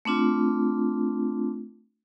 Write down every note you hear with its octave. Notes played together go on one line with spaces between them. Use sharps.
A3 C4 D4 F4